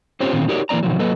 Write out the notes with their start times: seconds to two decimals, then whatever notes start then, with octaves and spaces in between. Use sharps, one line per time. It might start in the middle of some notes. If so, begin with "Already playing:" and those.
0.20 C4 C#4 F4 G4 C5 C#5
0.33 A#2 D3 D#3 C4 C#4 F4
0.48 D#4 F#4 G4 A#4 C#5 D5
0.69 E3 A#3 C#4 D5 A#5
0.83 B2 D#3 F3 F#3
0.99 F#3 A#3 A4 B4 D#5